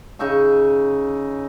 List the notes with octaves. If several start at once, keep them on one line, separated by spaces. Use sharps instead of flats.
C#3 D#4 E5 C#6